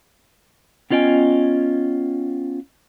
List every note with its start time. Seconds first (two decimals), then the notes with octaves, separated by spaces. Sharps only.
0.90 B3 C#4 F4 D#5 G5 G#5